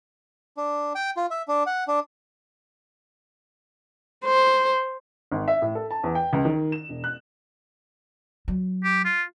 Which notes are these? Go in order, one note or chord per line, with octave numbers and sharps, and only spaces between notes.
D4
G5
F4
E5
D4
F#5
D4
C5
G#1
E5
A2
A4
A5
E2
G5
C#2
D#3
E7
E1
F#6
F#3
G4
F4